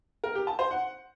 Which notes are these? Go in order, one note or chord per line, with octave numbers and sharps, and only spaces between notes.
A#4
G4
A5
C5
F#5